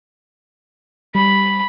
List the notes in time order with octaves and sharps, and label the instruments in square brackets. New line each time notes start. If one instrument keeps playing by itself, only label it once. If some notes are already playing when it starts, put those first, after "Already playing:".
[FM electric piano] G3 [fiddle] B5